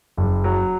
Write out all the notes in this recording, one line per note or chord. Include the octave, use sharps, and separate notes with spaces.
F#1
F#3